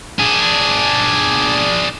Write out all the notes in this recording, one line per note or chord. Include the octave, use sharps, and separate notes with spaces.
D4 G#4